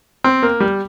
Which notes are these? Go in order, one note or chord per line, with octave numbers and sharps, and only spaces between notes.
C4
A#3
G3